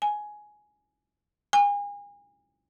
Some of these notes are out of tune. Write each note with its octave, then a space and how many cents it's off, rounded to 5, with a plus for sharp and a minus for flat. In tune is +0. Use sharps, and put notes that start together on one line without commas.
G#5 +10
G#5 -35